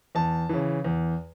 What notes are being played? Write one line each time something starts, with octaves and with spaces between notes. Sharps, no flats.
E2 A5
C#3 E3
E2